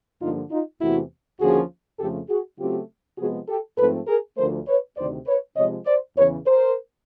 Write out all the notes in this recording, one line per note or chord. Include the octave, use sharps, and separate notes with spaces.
G2 D3 F3 A#3 D#4 F4
D#4 F4
E2 C3 E3 A3 E4 F#4
D#2 D3 F3 A#3 C#4 F#4 G#4
F2 C#3 F3 A3 G4 A4
F#4 G#4
C#3 F#3 A3 C4 F4 G4
C3 F3 G#3 B3 F#4 G#4
G4 A4
G#2 F3 A3 C4 A4 B4
G#4 A#4
D2 D3 F3 A3 A#4 C5
B4 C#5
D2 C3 D#3 C5 D5
B4 C#5
C3 F3 G#3 C#5 D#5
C5 D5
E2 C#3 E3 B4 C#5
A#4 C5